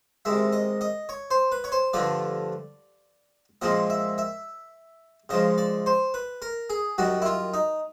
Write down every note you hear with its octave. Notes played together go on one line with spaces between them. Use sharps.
C3 D#3 G#3 E5
D#5
D#5
C#5
C5
B4
C#5
C5
G2 D3 F3 A3 D5
A#2 F3 G#3 C4 D#5
E5
E5
C#3 F3 G#3 D#5
D5
C5
B4
A#4
G#4
F#2 D#3 G3 F#4
E4
F4
D#4